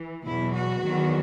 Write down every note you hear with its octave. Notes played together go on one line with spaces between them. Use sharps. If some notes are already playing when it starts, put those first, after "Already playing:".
Already playing: E3
E2 B2 F#3 E4
F#4
E2 D#3 F#3